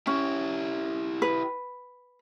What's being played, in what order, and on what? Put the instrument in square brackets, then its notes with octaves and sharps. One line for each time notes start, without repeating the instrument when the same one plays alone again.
[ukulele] C#4 [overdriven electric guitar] E4 G4
[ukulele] B4